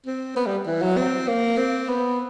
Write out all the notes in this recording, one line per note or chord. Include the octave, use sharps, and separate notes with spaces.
C4
B3
G3
E3
F#3
C4
A#3
C4
B3